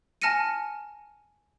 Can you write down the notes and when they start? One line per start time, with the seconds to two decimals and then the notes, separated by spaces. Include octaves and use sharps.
0.22 G#5 A5 F6 A#6 C#7 D#7